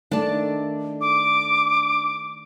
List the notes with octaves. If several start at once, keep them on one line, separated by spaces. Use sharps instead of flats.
D#3 A3 D4 D5 A5
D6